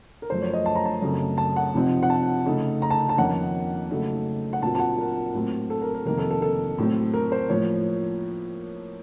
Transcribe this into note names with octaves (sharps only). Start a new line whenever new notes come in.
A#4
F#2 F3 A3 C5
C#5
D#5
A5
A#5
A5
F#2 C#3 A3 C4
A5
F#5
C3 F3 C4 D#4
F#5
A5
C#3 A3 D#4
A#5
A5
A5
F2 D#3 A#3 C#4 F#5
C#3 F#3 A3 D#4
F#5
A#2 F#3 C4 F4 A5
A5
F#5
A#4
A2 F#3 C4
A4
A#4
A#4
F2 C3 D#3 A#3 A#4
A4
A4
A4
A2 F#3 C4
A#4
C5
A2 F3 A#3 C#5